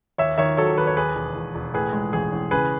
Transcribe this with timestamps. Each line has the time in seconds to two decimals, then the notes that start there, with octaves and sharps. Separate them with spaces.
0.18 D#2 C#5 E5
0.38 D#3 C#5 E5
0.57 F#3 A4 C#5
0.77 D#2 B4
0.87 C#5
0.96 D#2 G#4 B4
1.15 E1
1.35 E1
1.55 E1
1.74 A2 G#4 B4
1.93 G#3
2.13 A1 G#4
2.32 A1
2.51 C#3 G#4 B4